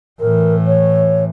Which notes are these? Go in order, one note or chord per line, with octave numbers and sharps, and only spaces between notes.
A2 E3 A#4
C#5